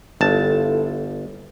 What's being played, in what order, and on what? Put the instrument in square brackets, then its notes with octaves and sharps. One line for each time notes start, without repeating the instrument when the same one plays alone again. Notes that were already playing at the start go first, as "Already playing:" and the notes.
[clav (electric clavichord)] G1 A5 [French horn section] E4 F4 A4